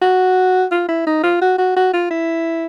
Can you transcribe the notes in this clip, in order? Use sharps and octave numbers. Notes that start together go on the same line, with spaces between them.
F#4
F4
E4
D#4
F4
F#4
F#4
F#4
F4
E4